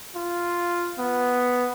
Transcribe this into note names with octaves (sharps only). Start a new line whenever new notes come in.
F4
B3